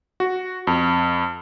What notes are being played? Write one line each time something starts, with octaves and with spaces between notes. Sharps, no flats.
F#4
F2